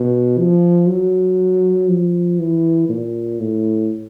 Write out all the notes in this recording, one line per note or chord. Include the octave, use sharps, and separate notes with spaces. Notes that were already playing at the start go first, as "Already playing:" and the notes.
Already playing: B2
F3
F#3
F3
E3
A#2
A2